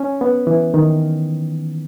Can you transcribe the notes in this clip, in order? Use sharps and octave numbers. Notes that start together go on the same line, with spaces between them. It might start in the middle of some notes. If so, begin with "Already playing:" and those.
Already playing: C#4
B3
E3
D#3